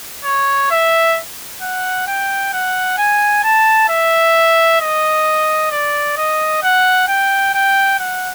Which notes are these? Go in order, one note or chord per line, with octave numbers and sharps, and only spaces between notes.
C#5
E5
F#5
G5
F#5
G#5
A5
E5
D#5
D5
D#5
F#5
G5
G5
F#5